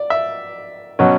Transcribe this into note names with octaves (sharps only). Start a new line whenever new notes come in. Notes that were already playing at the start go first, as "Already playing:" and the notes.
Already playing: D5
E5
B2 F#3 C#4